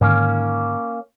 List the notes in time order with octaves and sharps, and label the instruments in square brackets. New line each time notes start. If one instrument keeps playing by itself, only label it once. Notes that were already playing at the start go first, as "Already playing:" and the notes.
[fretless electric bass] G#2 D3 D#3 [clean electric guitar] A#3 C#4